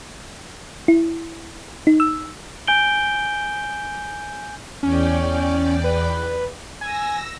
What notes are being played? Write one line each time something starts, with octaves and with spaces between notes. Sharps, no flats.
E4
D#4
E6
G#5 G6 D7 G7
E2 C#4 D5 G5
B4
G#5 E6 A#6